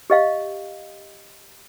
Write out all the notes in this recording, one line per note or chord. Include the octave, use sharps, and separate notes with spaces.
G4 D#5 F5